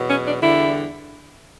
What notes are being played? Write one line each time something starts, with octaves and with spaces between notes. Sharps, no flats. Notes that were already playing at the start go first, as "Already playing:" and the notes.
Already playing: E2 B2 F#3
C#4
D4
E2 D3 G3 E4